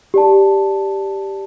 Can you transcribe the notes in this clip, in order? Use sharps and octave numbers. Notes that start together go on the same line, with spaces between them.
G4 D5 A5